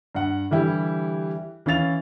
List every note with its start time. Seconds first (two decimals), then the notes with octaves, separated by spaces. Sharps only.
0.15 G2 F#5
0.51 D3 E3 G3 E4 G4
1.66 E3 C#4 F5 A6 F7